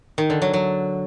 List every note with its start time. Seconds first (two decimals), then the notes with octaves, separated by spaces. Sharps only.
0.18 D#3
0.30 D3
0.42 F#3
0.53 F#3